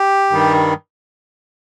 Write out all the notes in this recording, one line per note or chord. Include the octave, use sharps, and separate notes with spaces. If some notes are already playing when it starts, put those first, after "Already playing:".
Already playing: G4
G2 D#3 G3